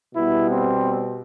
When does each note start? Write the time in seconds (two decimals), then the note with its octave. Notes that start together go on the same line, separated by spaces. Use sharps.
0.14 B2 G3 B3 E4
0.51 C4